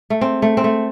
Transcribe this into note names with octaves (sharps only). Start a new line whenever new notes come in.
A3
C4
A3
C4
A3